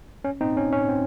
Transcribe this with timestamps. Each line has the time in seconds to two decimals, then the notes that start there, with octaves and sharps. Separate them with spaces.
0.25 C#4
0.41 C4 D#4
0.57 C#4
0.73 C#4
0.89 C4